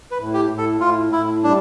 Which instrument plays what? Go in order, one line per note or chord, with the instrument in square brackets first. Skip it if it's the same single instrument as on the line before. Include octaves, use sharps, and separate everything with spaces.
[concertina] B4
[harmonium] A2
[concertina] G4
[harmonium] A2
[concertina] A4
[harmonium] A2 [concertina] F4
[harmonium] A2 [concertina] E4
[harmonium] G3 [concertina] D4